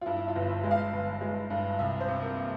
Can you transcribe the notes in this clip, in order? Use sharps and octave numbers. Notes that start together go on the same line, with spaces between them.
F4
G2 E4
E4
F4
G1
E5
G#3
F5
G1
G#3
G2
C2 E5
C5
C3
A#4
A#3